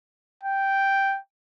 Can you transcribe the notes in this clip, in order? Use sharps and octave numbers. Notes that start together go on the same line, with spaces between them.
G5